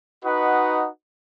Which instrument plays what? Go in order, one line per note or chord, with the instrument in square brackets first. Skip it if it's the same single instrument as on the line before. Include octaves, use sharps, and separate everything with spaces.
[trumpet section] D#4 F#4 B4 D#5 F#5